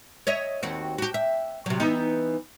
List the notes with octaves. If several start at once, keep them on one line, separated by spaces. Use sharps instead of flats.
C#5 D#5 E5
D#2 C4 F#4
F#4 G4
E5
C3 F#3
E3 B3 D#4